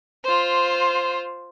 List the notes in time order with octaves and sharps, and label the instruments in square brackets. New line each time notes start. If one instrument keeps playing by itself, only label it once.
[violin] F4 C5